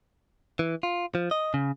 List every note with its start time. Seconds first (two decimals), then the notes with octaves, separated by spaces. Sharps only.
0.59 E3
0.83 F4
1.15 F3
1.31 D#5
1.54 C#3